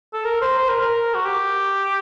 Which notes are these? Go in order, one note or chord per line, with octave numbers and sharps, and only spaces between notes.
A4
A#4
C5
C5
A#4
A#4
F#4
G4